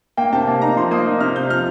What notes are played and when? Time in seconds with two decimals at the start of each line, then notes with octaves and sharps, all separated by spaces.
0.17 A#3 G5
0.33 C3 A5
0.47 A#3 A5
0.61 D#4 A#5
0.76 F3 C6
0.91 A#3 D#6
1.06 D#4
1.21 C3 F6
1.35 D#4 G6
1.50 F3 F6